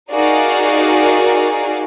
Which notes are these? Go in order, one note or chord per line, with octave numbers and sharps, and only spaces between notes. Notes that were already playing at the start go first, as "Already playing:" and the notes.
D#4 F#4 G#4 A#4 D5 F5